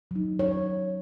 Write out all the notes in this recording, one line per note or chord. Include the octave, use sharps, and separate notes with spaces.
F#3 D#4
C#5